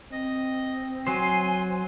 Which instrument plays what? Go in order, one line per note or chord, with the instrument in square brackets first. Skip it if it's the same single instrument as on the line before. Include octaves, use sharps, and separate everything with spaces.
[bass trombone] C4 [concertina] D#5
[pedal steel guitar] F#3 C5 [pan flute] G#5 [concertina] C6